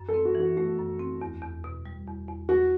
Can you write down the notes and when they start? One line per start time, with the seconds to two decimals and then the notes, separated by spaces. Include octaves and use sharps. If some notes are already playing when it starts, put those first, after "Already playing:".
Already playing: F#2
0.08 A4
0.14 C4
0.25 F#4
0.35 E3
0.40 F#4
0.57 A3 F#4
0.78 F#2
1.00 C4
1.21 E2
1.42 E2
1.64 B2
1.86 G3
2.07 E2
2.28 E2
2.49 E2 F#4